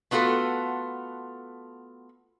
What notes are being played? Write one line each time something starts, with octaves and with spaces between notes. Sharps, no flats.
A3 B3 F4 F#4 A4